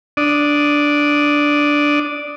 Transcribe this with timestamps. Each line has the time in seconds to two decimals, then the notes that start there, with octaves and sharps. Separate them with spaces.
0.17 D4 D5 D#6